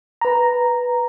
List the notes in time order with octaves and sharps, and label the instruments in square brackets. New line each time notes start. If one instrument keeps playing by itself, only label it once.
[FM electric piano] B4 A#5